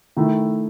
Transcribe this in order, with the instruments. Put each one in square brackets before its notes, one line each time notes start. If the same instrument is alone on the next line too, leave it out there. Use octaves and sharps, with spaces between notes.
[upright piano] D#3 A3 E4